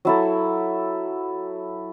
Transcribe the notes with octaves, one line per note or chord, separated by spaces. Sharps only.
F#3 E4 A4